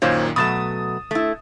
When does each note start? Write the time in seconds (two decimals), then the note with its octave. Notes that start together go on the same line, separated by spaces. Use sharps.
0.02 F#2 A#2 D#3 A#3 C5 C#5
0.36 B2 F#3 A3 D#6 A6 E7
1.11 A3 E4